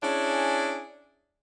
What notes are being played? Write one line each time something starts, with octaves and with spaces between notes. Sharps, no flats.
C#4 D4 E4 G#4